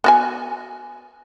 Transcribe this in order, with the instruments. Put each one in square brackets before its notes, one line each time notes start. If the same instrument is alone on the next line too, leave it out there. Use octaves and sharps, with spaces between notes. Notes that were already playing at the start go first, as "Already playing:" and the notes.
[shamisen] B3 F#4 G#5